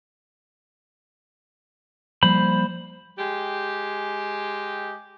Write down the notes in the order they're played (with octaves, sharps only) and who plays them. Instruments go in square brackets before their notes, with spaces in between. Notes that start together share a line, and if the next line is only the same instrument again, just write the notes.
[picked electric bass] F3 G3 A#3 [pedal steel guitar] C5 B5
[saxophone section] G#3 G4